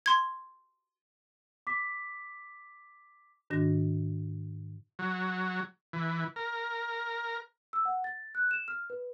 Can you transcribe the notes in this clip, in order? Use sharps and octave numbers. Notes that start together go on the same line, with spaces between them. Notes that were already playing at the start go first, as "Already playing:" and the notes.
C6 G#6
D6 B6
G#2 D#3 D4 F#4 A#6
F#3
E3
A#4
E6
F#5
A6
F#6
E7
F6
B4